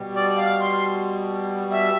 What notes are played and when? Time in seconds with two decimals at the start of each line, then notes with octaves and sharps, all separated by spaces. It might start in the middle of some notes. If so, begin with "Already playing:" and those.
Already playing: B2 G3
0.16 D5
0.37 F5
0.61 C6
1.72 E5